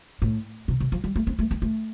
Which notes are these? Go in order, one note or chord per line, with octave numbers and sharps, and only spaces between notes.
A2
C3
C3
F3
G3
A3
C4
A3
C4
A3